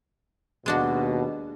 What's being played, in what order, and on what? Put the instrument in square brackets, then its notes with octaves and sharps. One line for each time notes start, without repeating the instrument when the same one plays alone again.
[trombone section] D#2 B2 [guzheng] G#3 D4 F#4